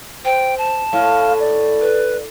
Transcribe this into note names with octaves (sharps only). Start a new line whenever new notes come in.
C5 G5
A5
A2 F5
D5
B4